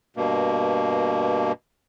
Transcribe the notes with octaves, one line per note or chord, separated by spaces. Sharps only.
G2 B2 A#3